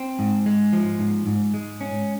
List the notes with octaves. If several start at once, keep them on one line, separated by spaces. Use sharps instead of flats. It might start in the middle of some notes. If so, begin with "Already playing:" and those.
Already playing: C4
G#2
G#3
F3
G#2
G#2
G#3
C#4